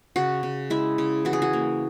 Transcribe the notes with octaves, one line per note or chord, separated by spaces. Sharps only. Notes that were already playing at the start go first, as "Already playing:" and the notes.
C#3 F#4
C#3
G#3 E4
C#3
E3 F#4
G#4
F#4
A#3